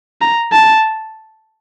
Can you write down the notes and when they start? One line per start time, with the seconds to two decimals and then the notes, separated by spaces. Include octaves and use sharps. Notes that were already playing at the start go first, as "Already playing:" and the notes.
0.21 A#5
0.52 A5